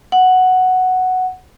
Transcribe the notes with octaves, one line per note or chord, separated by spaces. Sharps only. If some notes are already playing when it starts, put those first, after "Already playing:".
F#5